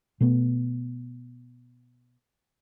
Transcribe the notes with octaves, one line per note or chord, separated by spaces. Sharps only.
B2 A3 B3